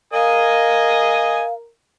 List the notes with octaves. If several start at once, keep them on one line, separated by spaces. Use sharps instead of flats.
A#4 D#5 F5 G#5 D#6